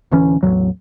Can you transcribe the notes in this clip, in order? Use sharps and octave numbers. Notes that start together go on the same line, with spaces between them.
D1 D2 E3 C#4
A1 E2 A2 F#3